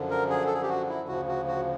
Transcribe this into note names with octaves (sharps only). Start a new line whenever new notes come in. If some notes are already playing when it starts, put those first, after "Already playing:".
Already playing: F#2 D3 F3
A#4
G#4
A4
G#4
G4
F#4
E4
D2 C#3 F3 F#4
F#4
F#4